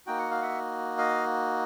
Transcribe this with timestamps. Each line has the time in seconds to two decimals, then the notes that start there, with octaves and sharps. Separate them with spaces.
0.07 A#3 D#4 F#4 G5
0.19 F#5
0.31 F5
0.42 E5 F#5
0.98 D#5 F5